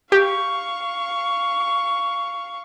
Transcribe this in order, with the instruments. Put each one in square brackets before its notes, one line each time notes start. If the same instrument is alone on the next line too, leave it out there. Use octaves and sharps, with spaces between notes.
[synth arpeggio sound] G4 [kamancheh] F5 C#6